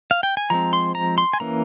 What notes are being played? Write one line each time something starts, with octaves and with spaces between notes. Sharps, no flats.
F5
G5
G#5
F3 G#3 C4 A#5
C6
A#5
C6
G#5
E3 A#3 C#4 A#5